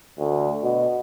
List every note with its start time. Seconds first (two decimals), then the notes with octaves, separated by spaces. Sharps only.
0.19 D2
0.63 B2